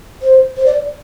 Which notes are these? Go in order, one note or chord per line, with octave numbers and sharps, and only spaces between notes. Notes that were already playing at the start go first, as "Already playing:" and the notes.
C5
C5
D5